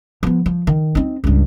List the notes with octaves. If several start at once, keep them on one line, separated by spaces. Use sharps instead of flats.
F3 B3
F3
D#3
C4 D#4
C#2 G2